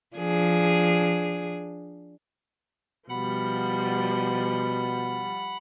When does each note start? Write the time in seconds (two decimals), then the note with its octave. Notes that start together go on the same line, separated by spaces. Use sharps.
0.17 F3 D4 G#4
3.09 B2 F3 G3 F#5 B5